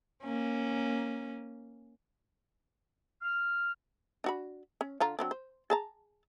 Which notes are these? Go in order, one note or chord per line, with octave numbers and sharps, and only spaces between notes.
A#3 C#4
F6
D4 F#4 B5
C#4
D3 F4 A#5
F#3 C4 D4
C5
G#4 A5 A#5